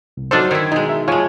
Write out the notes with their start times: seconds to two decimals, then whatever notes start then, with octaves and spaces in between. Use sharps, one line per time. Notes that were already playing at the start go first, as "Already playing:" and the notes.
0.17 C2
0.31 F#3 D4 D#4 F4 A4 C5
0.51 D#3 E4 G6 G#6
0.72 B2 G#3 D#4
0.89 E5
1.08 F3 G#3 F4 C#5 G#5